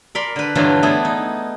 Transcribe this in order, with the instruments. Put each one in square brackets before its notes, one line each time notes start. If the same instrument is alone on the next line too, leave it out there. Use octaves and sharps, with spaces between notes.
[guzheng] A#4 D5 B5 C6
D3 B4
G2 D3 E3 F#3 D4 F4
A3 B3 E4 G#4
D#4